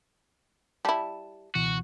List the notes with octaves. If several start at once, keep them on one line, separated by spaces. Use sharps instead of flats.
G3 E4 A5
C#2 B2 E3 F#4